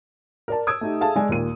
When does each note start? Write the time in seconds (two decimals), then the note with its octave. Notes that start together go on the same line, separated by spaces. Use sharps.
0.48 A#4 D5 A5
0.67 D#6 E6 G#6 D7
0.81 A3 D#4 G4
1.01 G#4 A4 E5 F5 G#5 A5
1.16 G#3 D5 G#5
1.29 D#2 A#2 D#7